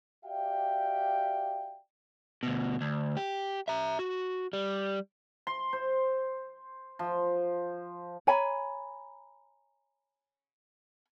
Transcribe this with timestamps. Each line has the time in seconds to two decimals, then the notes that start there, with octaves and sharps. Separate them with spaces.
0.25 F#4 G4 D5 E5 F5 G5
2.43 D2 B2
2.81 D2
3.17 G4
3.68 E5 A#5
3.99 F#4
4.53 G3
5.47 C6
5.73 C5
6.99 F3
8.27 C#5 G#5 A#5 B5